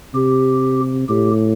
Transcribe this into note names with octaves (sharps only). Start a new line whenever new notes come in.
C3 G4
A2 G4